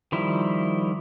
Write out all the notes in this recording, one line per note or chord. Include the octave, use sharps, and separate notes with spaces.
D#3 F3 G3 E4